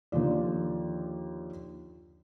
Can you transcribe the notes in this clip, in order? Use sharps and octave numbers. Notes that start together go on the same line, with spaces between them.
D#2 D3 F3 D5